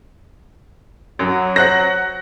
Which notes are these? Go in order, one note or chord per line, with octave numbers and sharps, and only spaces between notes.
F#2 F#3
C5 F#5 F#6 A#6